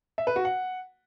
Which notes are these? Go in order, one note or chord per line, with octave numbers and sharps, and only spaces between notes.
E5
B4
F#4
F#5